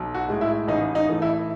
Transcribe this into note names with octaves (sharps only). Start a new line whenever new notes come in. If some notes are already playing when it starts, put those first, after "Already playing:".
Already playing: B1
F#4
A2 G#3
E4
A1 D#4
D#4
A2 E3 A3
E4